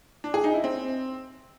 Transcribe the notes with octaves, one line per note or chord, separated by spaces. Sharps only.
D4
G#4
D#4
E4
C4